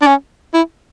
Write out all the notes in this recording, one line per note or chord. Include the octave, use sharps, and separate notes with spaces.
D4
C#4
E4